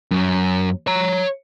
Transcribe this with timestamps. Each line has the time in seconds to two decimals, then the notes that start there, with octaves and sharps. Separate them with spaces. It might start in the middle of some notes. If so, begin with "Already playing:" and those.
0.11 F#2
0.87 C#5 A#5